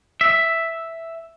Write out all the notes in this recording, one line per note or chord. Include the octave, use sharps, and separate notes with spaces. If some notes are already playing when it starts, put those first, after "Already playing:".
E5